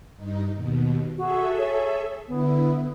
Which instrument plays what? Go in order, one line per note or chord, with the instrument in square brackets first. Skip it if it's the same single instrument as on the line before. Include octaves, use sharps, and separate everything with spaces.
[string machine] G2 D#4
D#2 B2
[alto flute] F#4 [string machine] G#4 A4 E5
[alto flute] C#5
[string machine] D3 E4 [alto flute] B3